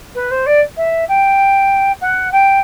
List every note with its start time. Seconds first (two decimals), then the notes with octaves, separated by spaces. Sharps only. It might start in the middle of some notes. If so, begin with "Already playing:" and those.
0.15 B4
0.31 C5
0.46 D5
0.77 E5
1.08 G5
2.01 F#5
2.32 G5